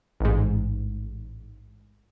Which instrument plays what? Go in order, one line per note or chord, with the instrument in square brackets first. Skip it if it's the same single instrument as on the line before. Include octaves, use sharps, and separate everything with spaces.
[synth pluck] A1 G#2